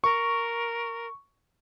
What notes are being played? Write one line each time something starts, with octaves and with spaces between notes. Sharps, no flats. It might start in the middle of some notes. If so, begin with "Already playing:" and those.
A#4 C#6